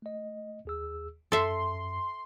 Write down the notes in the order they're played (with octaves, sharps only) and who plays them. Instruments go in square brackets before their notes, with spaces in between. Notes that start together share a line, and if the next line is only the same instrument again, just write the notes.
[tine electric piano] A3 D#5
D#2 G#4 E6
[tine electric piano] F#2 [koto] A4 E5 [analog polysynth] C6